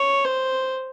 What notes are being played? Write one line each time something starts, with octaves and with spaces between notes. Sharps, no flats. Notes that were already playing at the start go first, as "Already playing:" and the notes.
Already playing: C#5
C5